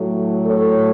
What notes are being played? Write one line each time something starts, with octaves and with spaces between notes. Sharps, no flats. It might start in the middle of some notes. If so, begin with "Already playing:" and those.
Already playing: A2 F#3 A3
A4 C#5